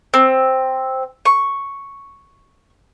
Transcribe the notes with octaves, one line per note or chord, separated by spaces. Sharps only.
C4
C#6